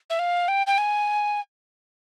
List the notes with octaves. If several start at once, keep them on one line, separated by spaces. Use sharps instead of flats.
E5
F5
G5
G5
G#5